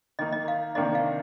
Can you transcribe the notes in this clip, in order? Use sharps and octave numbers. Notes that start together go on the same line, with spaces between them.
D#3 A#3 D#4 D#5
D#5
F5
C3 D#3 A#3 D4 D#5
F5